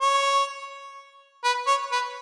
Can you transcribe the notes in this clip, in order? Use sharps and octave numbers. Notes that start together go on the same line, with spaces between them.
C#5
B4
C#5
B4